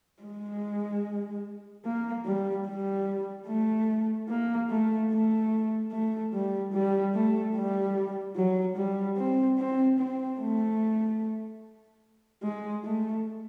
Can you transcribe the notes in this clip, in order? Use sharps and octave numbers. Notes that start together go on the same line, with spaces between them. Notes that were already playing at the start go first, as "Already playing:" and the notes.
G#3
A#3
G3
G3
A3
A#3
A3
A3
A3
G3
G3
A3
G3
F#3
G3
C4
C4
C4
A3
G#3
A3